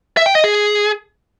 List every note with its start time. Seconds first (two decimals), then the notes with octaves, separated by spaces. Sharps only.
0.17 E5
0.26 G5
0.35 D#5
0.44 G#4